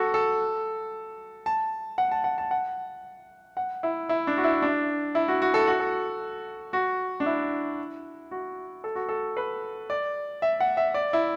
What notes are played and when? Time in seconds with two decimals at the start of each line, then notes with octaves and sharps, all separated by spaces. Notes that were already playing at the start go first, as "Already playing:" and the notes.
Already playing: F#4 A4
0.14 A4
1.46 A5
1.98 F#5
2.12 A5
2.24 F#5
2.38 A5
2.51 F#5
3.57 F#5
3.83 E4
4.09 E4
4.27 D4
4.37 F#4
4.44 E4
4.62 D4
5.15 E4
5.28 F#4
5.42 F#4
5.54 A4
5.67 F#4
5.80 A4
6.73 F#4
7.20 D4
7.26 E4
8.31 F#4
8.84 A4
8.95 F#4
9.09 A4
9.37 B4
9.90 D5
10.42 E5
10.60 F#5
10.77 E5
10.94 D5
11.13 E4